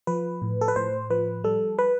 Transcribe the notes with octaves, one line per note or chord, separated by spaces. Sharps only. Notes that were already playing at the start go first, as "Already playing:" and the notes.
F3 B4
A2
A4
B4
A2 C5
F3 B4
G3 A4
B4